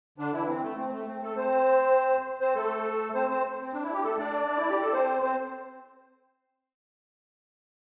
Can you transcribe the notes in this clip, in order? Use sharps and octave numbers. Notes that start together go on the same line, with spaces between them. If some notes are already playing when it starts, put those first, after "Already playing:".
D3 D4
E3 E4
C4
A3
C4
A3
C4
A3 A4
C4 C5
C4 C5
A3 A4
C4 C5
C4 C5
C4
D4
E4
G4
A3 A4
D4 D5
D4
E4
G4
A4
C4 C5
C4 C5